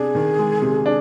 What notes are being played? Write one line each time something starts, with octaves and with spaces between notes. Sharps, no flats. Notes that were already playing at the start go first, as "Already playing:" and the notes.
Already playing: C3 D4 G#4
D#3
G#3
C3
D4